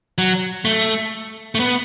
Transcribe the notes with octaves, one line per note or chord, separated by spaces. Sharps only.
F#3
A3
A3
B3